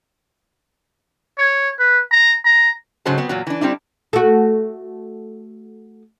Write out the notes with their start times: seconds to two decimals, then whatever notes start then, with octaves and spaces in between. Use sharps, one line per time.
1.39 C#5
1.79 B4
2.11 A#5
2.45 A#5
3.05 G#2 C#3 F#3 G#3 C5 A5
3.18 F#3 B3 C4
3.29 E2 A#2 F#3
3.47 E3 D4
3.61 G3 C4 D4 E4
4.13 A3 F#4